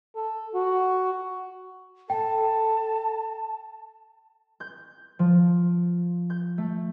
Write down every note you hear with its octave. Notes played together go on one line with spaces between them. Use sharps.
A4
F#4
A4 G5 A5
G6
F3
G6
A3